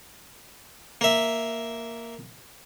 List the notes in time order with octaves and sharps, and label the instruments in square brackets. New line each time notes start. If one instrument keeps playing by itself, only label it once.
[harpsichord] A#3 E5